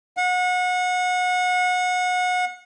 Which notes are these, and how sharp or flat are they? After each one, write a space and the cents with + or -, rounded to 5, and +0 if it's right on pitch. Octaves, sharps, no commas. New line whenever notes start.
F#5 -30